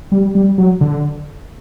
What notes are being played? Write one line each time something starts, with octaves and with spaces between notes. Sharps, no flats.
G3
G3
F#3
D3